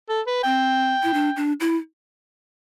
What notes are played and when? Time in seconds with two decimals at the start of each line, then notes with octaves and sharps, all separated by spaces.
0.09 A4
0.27 B4
0.44 C4 G5
1.03 E4
1.14 D4
1.36 D4
1.60 E4